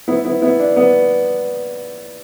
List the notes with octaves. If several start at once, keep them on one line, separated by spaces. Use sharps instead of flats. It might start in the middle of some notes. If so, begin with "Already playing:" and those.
B3 E4
B3 E4
B3 E4
D4
B3